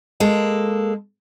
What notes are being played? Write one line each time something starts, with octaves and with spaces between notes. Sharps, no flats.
G#3 A#3 A4